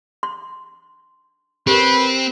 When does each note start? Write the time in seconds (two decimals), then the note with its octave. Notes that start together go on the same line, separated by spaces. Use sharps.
0.23 C6
1.67 C4 G4 A#4 B4